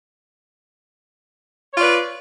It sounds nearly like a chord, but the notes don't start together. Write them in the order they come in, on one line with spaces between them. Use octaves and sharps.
C#5 F4 D5 B4